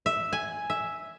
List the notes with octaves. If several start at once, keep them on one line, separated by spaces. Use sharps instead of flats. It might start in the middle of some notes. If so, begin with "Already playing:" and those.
E5
G#5
E5